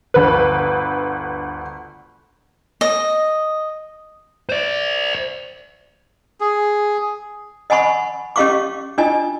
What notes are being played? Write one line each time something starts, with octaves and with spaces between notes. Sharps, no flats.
G1 D2 B4
D#5
C5 D5
G#4
D#5 F#5 G#5 B5 C#6
C#4 G4 D#5 F5 C#6 D6
D4 F4 D#5 G#5